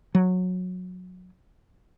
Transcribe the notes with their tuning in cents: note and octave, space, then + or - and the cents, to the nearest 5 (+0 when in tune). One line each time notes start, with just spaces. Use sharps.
F#3 -20